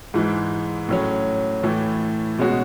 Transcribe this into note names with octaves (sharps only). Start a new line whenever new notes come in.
G#2 E3 G#3
A2 F#3 C#4
A2 E3 A3
B2 G#3 C#4 F#4